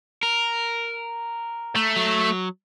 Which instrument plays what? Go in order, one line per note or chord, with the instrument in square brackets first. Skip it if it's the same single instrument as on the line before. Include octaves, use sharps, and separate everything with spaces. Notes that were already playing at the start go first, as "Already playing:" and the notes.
[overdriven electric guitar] A#4
[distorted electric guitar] A3
[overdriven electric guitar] F#3